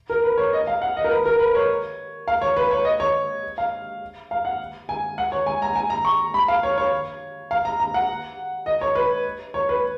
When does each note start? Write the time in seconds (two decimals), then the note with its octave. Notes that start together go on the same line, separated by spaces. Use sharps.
0.10 A#4
0.24 B4
0.38 C#5
0.53 D#5
0.67 F5
0.82 F#5
0.97 D#5
1.04 A#4
1.11 B4
1.26 A#4
1.39 B4
1.55 C#5
2.28 F5
2.41 C#5
2.57 B4
2.71 C#5
2.85 D#5
3.00 C#5
3.58 F5
4.31 F5
4.45 F#5
4.89 G#5
5.18 F#5
5.32 C#5
5.46 G#5
5.62 A#5
5.76 G#5
5.90 A#5
6.05 C#6
6.34 B5
6.48 F5
6.63 C#5
6.78 C#5
7.51 F5
7.65 A#5
7.80 A#5
7.94 F#5
8.66 D#5
8.81 C#5
8.95 B4
9.54 C#5
9.69 B4